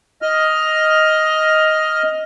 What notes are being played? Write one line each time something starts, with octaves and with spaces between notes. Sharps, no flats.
D#5 F6